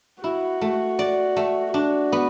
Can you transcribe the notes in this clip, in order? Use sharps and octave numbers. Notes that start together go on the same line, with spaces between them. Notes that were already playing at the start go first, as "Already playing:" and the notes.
E4 F#4
A3
D5
A3
D4 F#4
B3